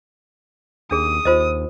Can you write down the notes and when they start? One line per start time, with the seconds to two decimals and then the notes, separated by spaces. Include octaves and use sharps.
0.91 D#2 D4 G#4 D#6
1.25 D#2 F4 C5 D#5